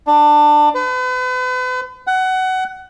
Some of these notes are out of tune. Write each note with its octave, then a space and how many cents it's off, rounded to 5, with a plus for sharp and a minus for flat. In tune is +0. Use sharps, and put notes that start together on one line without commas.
D4 +20
B4 +40
F#5 +20